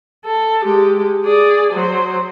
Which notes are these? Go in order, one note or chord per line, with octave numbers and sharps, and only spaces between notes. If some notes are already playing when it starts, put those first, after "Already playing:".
A4
G#3 G4
G#4 D5
F#3 C5